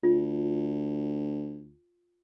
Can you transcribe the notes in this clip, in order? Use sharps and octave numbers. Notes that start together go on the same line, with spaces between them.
D2 F4